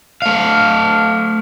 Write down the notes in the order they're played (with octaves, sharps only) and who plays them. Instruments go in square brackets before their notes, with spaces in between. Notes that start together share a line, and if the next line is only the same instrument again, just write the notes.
[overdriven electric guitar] A3 F5